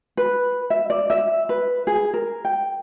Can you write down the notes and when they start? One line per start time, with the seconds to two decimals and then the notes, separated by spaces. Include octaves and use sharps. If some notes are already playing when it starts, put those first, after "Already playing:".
0.17 B4
0.70 E5
0.90 D5
1.10 E5
1.49 B4
1.87 G#4
2.14 A#4
2.45 G5